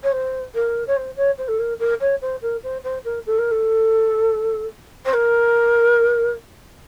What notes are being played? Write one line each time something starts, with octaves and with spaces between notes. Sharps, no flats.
C#5
C5
A#4
C#5
C5
C#5
C5
A4
A#4
A#4
C#5
C5
A#4
C5
C5
A#4
A4
A#4
A4
C5
A#4